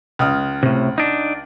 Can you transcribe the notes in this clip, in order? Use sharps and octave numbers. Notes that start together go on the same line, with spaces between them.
C#2 D#6 F6
A2 C3
D4 D#4